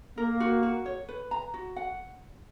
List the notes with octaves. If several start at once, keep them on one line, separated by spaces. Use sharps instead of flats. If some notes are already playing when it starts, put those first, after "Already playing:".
A#3 A#4
F#4
F#4
C#5
B4
A#5
F#4
F#5